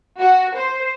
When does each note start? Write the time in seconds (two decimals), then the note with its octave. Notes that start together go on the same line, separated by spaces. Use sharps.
0.19 F#4
0.57 C5